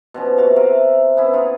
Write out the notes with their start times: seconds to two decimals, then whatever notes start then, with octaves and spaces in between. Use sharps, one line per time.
0.14 B2 F3 C#4
0.38 C3 F#4 F5
0.56 F4 A#4 E5 F5
1.17 B3 C#4 E4
1.33 D#4 F4